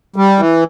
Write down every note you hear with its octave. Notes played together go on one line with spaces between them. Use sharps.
G3
E3